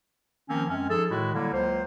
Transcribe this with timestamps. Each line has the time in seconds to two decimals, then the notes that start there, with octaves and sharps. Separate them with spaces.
0.50 D#3 F3 A#3 C4 C#4
0.70 F#2 G#3 C4 C#4
0.90 F3 D#4 G#4 A4
1.11 A2 D#3 G#3 E4 F#4
1.34 D3 F#3 G3 A#3 E4
1.53 C#2 F#3 A#3 C5